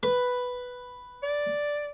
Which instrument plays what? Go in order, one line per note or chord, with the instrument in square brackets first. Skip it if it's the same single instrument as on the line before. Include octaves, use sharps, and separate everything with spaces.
[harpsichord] B4
[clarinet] D5